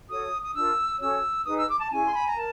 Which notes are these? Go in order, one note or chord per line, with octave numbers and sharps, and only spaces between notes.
F#4 A4 C#5 D#6
D#6
D4 F4 A#4 E6
C#4 F#4 A4 C#5 E6
D#4 G#4 B4 D#6
E6
D6
A5
C#4 E4 G#4 G#5
C6
B5
A#5
A#4 A5